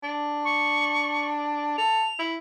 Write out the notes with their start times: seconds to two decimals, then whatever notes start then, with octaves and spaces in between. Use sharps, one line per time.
0.03 D4
0.44 C#6
1.78 A4 F7
2.19 E4